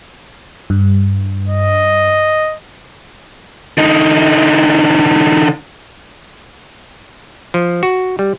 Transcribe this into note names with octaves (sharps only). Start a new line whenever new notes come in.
G2
D#5
D3 D#4
F3
F#4
G3